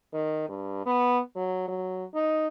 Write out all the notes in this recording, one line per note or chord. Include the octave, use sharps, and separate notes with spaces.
D#3
G2
B3
F#3
F#3
D#4